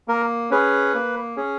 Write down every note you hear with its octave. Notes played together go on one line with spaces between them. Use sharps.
A#3 A#4
C#4 G#4 B4
A#3
C#4 G#4